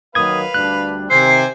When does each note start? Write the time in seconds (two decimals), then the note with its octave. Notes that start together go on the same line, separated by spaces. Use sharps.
0.15 D#3 F#3 A#3 B4 F5 D#6 G#6
0.54 D2 G3 D4 F#6
1.10 C3 D#3 C4 C5 G#5 C7